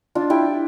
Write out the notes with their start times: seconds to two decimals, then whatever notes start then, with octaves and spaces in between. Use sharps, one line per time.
0.15 D4 F4
0.30 E4 G4